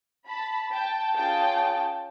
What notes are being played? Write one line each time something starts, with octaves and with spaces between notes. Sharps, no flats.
A5 B5
G5 A5
C#4 F4 G#4 G5 A5